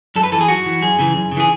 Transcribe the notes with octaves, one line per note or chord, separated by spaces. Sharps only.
F#2 A4
B4
E3 A4
G#4
F#2 F#4
E3
F#2 G#4
C#3 E3
F#2
C#3
E3 G#4